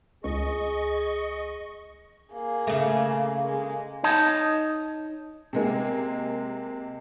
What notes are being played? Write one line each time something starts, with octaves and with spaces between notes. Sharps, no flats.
C#2 G#4 D#5 C#6
A#3 G#4
C#3 A3
G#3 A#3
D#4 C#5 D#5 A5
C3 G#3 A#3